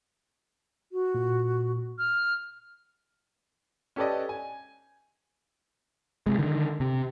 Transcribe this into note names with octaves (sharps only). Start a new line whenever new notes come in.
F#4
A#2
F6
C#4 G4 A4 B4 D5 D#5
G#5
C3 G#3
D3 D#3
C3